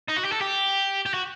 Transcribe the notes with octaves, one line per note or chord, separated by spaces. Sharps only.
D#4
F#4
G4
A4
G4
G4
F#4